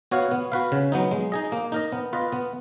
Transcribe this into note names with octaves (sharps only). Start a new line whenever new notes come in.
B3 F#4 C#5 F5
B3
F#4 B4 F5
C#3
F#3 B3 D#4
G#3
D#4 G#4 D#5
A#3
D#4 A#4 D#5
B3
F4 B4 D#5
B3